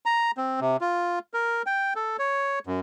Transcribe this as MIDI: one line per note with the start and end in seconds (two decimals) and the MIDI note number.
0.06 0.31 82
0.37 0.60 60
0.61 0.77 48
0.81 1.19 65
1.34 1.62 70
1.66 1.94 79
1.96 2.17 69
2.19 2.59 73
2.67 2.80 42